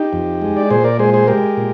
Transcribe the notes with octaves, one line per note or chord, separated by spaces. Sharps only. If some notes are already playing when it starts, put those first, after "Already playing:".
Already playing: D#4 G4
F2
G#3
D5
A#2 G#4 C5
A#4 D5
G#3 G#4 C5
G#4 C5
G#3 G4 A#4
A#2